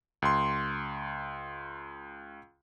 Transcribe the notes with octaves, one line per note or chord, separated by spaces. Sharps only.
C#2 C6